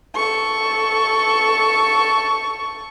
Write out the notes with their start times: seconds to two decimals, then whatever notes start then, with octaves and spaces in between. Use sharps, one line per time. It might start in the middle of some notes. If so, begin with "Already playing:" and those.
0.15 A4 C#6